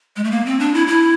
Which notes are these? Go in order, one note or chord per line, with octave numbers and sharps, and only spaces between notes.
G#3
A3
A#3
C4
D4
E4
E4